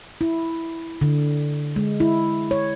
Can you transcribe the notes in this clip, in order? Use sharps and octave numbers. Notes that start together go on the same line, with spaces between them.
E4
D3
G#3
E4
C#5